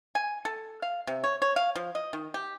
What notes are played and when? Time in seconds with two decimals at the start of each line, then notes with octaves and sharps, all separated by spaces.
0.15 G#5
0.45 A4
0.82 F5
1.07 C3
1.24 C#5
1.42 C#5
1.56 F5
1.76 F3
1.95 D#5
2.13 D#3
2.34 G4